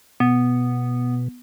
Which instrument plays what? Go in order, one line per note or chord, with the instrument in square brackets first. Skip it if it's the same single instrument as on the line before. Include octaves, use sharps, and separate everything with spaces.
[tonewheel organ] B2 [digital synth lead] B3